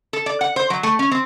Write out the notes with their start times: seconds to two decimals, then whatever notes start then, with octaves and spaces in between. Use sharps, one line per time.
0.13 A4
0.26 D5
0.41 F#5
0.56 C5
0.70 F#3
0.83 A3
0.99 C#4
1.11 C4